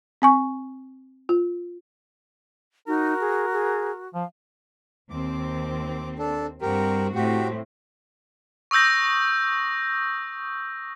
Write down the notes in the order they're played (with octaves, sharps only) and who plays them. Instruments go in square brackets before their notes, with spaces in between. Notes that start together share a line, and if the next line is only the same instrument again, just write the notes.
[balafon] C4 G#5 C#6
F4
[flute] D#4 [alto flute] F#4 [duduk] A#4
[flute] G#4
G#4
[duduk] F3 [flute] F5
[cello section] D#2 C4 [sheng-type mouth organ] D6
[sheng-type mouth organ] D4 A4
[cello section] G2 C4 F#4 [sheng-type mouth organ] G4 A#4
[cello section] A2 C4 [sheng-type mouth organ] F#4 G4
[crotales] C#6 D#6 E6 G6 A#6